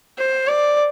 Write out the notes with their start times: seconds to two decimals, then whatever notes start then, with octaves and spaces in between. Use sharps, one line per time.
0.18 C5
0.48 D5